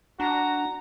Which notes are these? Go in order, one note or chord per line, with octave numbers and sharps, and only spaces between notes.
D4 F#4 A#5